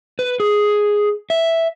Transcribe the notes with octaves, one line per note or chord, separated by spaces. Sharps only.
B4
G#4
E5